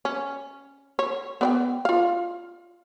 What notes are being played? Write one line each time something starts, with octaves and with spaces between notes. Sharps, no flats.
C#4
C#5
B3 D5 G5
F4 F5